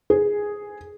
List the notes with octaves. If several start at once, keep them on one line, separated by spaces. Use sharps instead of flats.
G#4